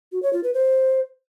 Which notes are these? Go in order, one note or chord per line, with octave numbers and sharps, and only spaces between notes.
F#4
C#5
F4
B4
C5